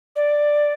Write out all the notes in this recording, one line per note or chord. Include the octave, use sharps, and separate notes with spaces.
D5